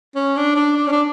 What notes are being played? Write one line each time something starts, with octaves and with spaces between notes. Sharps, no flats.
C#4
D4
D4
D4
C#4
D4